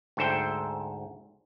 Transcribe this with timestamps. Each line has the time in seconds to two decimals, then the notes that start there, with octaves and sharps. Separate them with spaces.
0.17 D2 G#2 A4 C5 E5 G5